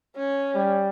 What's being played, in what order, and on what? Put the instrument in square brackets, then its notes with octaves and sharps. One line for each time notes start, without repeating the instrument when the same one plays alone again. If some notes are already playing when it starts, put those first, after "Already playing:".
[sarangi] C#4
[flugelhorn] G3